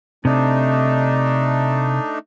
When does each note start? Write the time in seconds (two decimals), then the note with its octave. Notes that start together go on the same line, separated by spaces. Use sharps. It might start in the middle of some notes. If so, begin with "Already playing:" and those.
0.25 C3 A3 D4 D#4